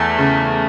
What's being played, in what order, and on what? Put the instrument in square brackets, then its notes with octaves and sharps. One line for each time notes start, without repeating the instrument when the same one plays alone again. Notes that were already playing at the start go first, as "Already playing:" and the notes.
Already playing: [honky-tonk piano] E2 [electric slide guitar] A3
[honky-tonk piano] C#3